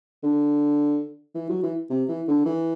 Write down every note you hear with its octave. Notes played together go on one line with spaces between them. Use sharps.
D3
E3
F#3
E3
C3
E3
D3
E3